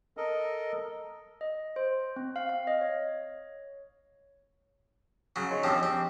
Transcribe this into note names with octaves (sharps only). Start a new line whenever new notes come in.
A4 A#4 D#5
D#5
C5
C4
F5
F5
D#5
C#5
C#3 F#3
G#3 D#4 C#5
D#2 F3 C4 D4 G4
C4